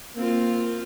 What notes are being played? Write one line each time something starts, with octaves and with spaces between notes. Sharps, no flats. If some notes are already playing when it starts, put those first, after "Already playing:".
A#3 C4 F4